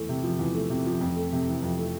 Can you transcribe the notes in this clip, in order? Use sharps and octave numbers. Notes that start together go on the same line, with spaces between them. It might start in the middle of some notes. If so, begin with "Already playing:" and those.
Already playing: E2 A3
C3
F3
E2
A3
C3
F3
F2
A3
C3
E3
F2
A3